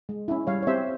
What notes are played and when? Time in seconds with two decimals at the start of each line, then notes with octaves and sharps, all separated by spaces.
0.09 G#3
0.28 C#4 E4
0.47 G3 C#5 F5
0.63 C#5
0.67 C4 G4 C5 E5